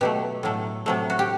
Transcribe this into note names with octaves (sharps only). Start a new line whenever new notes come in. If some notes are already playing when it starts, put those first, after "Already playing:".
B2 F#3 A3 G4
A2 F#3 A3
C3 F#3 A3
F#4
G4